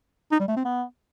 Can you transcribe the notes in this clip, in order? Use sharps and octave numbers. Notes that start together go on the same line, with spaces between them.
D#4
G3
A3
C4
B3